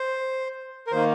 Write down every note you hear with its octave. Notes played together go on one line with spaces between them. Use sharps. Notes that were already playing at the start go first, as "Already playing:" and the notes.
Already playing: C5
A#4
D#3 A#3 C5